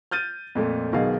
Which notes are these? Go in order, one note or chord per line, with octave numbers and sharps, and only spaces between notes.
F6 G6 A6 D#7
F2 A#2 A3
B1 B2 D#3 G#4 F5